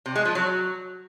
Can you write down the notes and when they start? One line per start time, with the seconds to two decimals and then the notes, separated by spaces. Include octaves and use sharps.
0.06 C3
0.15 G#3
0.25 F3
0.35 F#3